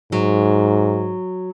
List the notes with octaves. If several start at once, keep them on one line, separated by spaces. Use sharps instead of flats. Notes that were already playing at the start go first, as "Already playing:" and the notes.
G#2 F#3